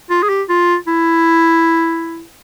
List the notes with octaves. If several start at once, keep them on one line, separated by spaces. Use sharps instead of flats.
F4
G#4
G4
F4
E4